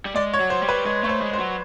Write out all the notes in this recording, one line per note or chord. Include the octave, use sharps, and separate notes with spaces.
G3
G#3 D5
C#5
F#3
C5
G3
B4
G#3 C#5
A3 C#5
C5
G#3
C5
F#3